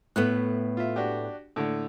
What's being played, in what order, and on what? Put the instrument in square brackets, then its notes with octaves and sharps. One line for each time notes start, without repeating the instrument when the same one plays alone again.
[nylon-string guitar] A2 A3 B3 [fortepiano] F#6
[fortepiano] F4 E5
D4 F#4 G4
A2 D3